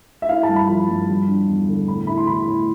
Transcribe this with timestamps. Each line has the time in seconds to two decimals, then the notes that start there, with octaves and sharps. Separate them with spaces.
0.22 E5
0.29 E4 F5
0.43 A5
0.49 G2
0.56 B5
0.68 F3
0.89 G2
1.09 G3
1.28 D4
1.48 E2
1.68 D3
1.87 A2 B5
2.07 E4 B5
2.17 C6
2.27 E3 B5
2.47 A2